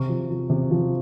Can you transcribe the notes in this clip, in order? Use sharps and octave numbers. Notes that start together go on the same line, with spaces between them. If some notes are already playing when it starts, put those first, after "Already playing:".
Already playing: C3 C#6
F3
F3
C3
F3